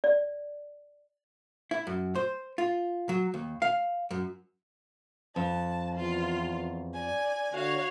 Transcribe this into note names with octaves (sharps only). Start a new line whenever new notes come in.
D5
E4
F#2
C5
F4
F#3
D#2
F5
F#2
F2 A5
E2 F4
D5 G#5
D3 F#4 C#5 F5